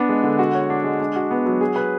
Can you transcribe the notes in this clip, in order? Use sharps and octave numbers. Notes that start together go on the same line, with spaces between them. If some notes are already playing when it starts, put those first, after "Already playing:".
Already playing: B3 D4
G#3
D3
F#4
C#5
D4
G#3
D4
F#4
B3
F#3
G#4
B4